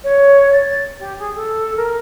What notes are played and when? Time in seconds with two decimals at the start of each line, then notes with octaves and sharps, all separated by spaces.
0.04 C#5
0.52 A6
0.99 G4
1.18 G#4
1.35 A4
1.76 A#4